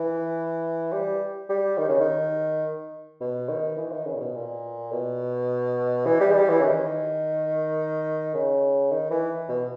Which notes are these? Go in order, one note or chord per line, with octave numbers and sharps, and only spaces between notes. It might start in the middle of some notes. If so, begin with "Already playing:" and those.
Already playing: E3
G3
G3
D#3
C#3
D#3
B2
D#3
E3
D#3
C#3
A#2
B2
A#2
B2
E3
G3
G#3
G3
E3
C#3
D#3
C#3
D#3
E3
B2